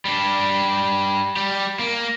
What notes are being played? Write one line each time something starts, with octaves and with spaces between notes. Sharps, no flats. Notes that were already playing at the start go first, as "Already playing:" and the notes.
G3 D4
G3 G4
A#3